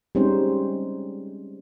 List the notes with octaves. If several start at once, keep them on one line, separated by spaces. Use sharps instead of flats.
G3 G#3 C4 C#4 D#4 C5